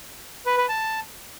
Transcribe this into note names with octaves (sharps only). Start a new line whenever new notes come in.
B4
B4
A5